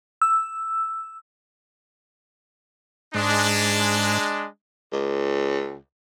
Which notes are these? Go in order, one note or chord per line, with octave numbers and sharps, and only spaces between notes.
E6
G#2 G#3 D4
C#2